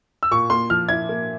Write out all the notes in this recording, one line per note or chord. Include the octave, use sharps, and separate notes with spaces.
E6
A#2 C#6
A#3 C6
F3 F6
E4 G#6
A#3